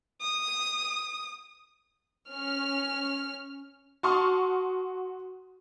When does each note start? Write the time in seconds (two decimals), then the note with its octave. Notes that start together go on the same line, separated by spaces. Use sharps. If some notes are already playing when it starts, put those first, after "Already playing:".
0.21 D#6
2.30 C#4 F6
4.03 F#4 A5 C6 C#6 D#6 F6